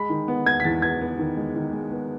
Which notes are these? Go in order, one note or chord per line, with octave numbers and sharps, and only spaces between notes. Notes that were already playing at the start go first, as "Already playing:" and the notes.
Already playing: G#3 B5
D#3
B3
B3 G#6
B6
E2 A6
B3 G#6
B3
D#3
G#3
D#3
G#3
B3